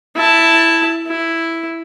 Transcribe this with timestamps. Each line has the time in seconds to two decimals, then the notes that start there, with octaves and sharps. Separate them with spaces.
0.15 E4 A5
1.07 E4